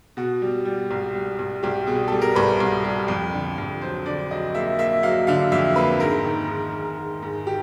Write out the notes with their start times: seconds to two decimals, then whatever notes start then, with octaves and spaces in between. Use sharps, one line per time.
0.17 B2 F#4
0.42 G3
0.65 G3
0.91 C2
1.15 G3
1.39 C2
1.63 C2 G4
1.87 B2 G#4
2.08 G3 A4
2.22 A#4
2.35 C2 B4
2.60 C2
2.84 G3
3.08 F2
3.33 D3
3.58 F2
3.81 F#3 C5
4.06 D3 D5
4.31 F#3 D#5
4.55 A#3 E5
4.79 A#3 E5
5.03 F#3 F5
5.27 D3 F5
5.52 F2 E5
5.76 A#3 B4
6.00 G#2 A#4
6.24 D#3
6.49 G#2
6.73 G#2
6.97 G#2
7.23 G#2
7.47 G4